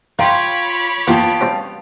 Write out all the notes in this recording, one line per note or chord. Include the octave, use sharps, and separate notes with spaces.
F4 A#4 C#5 F5 G5 B5 C6 D6
A#3 B3 F4 F5 G5 A5
G3 C4 C#4